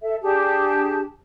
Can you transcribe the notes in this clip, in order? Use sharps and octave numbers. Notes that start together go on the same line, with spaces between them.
A4 E5
D4 G4 G#4 A5